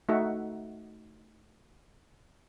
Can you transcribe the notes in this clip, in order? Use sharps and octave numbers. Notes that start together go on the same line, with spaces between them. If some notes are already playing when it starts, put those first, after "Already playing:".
A3 D#4 F#4 A4 E5 F#5